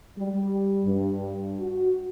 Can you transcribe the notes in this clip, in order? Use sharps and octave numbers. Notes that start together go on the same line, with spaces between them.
G3
G2
F#4